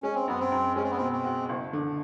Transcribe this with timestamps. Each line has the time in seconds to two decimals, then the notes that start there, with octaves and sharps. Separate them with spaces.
0.03 G#3 C#4
0.15 C4
0.27 F#2 B3
0.40 C4
0.52 F#2
0.76 G#3 C#4
0.84 C4
0.90 B3
0.97 B2 C4
1.12 C4
1.24 F#4
1.49 F#1
1.73 D3